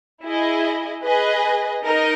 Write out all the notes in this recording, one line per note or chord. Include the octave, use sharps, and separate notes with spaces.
E4 G#4 D#5
G#4 B4 D#5
D#4 A#4 D#5